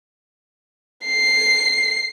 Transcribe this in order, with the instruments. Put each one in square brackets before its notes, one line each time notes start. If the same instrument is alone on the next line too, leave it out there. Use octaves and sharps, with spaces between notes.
[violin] C7